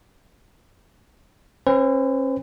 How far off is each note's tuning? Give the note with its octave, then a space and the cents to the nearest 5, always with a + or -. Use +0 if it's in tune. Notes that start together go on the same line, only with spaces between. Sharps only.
C#4 -40 B4 +40